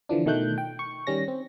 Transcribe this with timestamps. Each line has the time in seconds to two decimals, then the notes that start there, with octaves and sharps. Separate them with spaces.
0.09 D3 E3 F3 D4
0.25 B2 D#3 A3 F#6 G6
0.58 G5
0.79 C#6
1.07 D#3 G3 C#4 A#6
1.28 C4